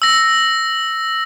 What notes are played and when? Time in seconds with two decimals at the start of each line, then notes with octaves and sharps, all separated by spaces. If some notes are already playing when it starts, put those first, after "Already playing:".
0.02 E6 A#6